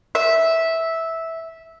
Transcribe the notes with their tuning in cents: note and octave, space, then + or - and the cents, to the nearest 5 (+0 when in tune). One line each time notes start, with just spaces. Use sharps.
E5 -10